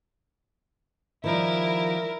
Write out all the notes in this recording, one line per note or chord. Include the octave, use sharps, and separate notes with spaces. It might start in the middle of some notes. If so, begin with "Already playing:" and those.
D#3 F3 G3 E4 A#4